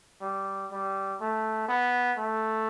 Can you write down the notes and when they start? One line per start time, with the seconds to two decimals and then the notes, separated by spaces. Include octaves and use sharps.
0.22 G3
0.71 G3
1.20 A3
1.69 B3
2.18 A3